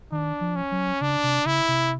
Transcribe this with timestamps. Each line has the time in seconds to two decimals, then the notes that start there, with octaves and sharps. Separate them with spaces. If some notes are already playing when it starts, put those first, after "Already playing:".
0.12 D#3 D4
0.41 F3
0.56 C#4
0.72 F#3
1.01 C#3 D4
1.24 C3
1.45 C#3 E4
1.68 C3